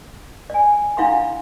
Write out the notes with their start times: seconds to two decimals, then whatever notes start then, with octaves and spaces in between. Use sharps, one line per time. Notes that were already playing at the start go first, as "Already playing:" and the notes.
0.50 D5 G#5
0.97 D4 E4 F5 F#5 B5 C6